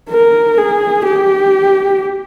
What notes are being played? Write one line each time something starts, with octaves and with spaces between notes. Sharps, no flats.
A#4
G#4
G4